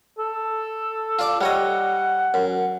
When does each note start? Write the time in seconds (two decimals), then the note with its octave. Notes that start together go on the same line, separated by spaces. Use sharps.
0.19 A4
1.19 F4 D5 D6
1.41 G3 C#5 D#5 F#5
2.34 F#2